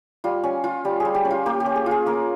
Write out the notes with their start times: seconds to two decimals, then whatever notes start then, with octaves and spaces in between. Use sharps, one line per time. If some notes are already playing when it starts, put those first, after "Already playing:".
0.24 G3 F4
0.44 C#4
0.64 F4
0.85 G3 G4
1.00 G3 G#4
1.15 G4
1.25 C#4
1.30 F4
1.46 A#3 G4
1.60 G4
1.66 C#4
1.76 G#4
1.86 F4 G#4
2.06 A#3 A#4